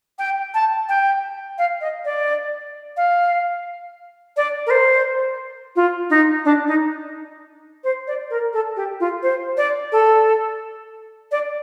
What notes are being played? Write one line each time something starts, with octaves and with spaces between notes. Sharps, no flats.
G5
A5
G5
F5
D#5
D5
F5
D5
A#4
C5
F4
D#4
D4
D#4
C5
D5
A#4
A4
G4
F4
C5
D5
A4
D5